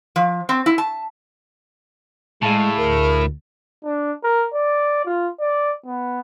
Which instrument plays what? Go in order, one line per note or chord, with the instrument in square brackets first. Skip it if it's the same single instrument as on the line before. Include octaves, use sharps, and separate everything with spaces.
[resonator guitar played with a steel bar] F3
C4
E4
A5
[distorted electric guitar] A2 [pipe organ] G#3 [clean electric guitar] G#4 F5 A5
[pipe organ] D2 [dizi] A#4
[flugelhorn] D4
A#4
D5
F4
D5
B3